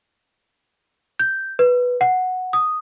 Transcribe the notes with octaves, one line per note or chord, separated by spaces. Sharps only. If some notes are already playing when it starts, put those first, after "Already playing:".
G6
B4
F#5
D#6